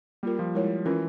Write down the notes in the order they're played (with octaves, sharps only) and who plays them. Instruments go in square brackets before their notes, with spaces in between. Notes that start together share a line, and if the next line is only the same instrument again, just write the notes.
[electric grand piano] G3 [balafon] A#3 F4 A#4
[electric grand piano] F3
[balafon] G#3 E4 A#4 C#5
[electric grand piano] E3 [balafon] C#4 F4 A#4